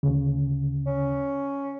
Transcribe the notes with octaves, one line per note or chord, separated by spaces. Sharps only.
D2 C#3
C#4